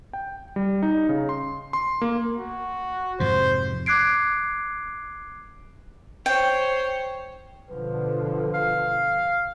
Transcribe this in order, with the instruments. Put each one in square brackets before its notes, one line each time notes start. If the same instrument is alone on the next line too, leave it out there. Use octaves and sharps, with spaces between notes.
[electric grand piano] G5
G3
D#4
C#3
C6
C6
A#3
[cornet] F#4
[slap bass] F2 G#2 C3 [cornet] C5
[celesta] D6 F#6 G#6 C7 D7
[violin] C5 C#5 [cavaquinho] G5
[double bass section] B2 D3 F3 [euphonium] B4
[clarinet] F5